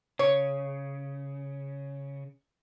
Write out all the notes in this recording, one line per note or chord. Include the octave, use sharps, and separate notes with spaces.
C#3 C#5